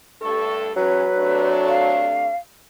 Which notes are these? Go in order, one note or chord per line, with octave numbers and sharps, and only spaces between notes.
G2 A3 A4 C#6
E2 F#3 C#4 B4
C3 A3 D4
F5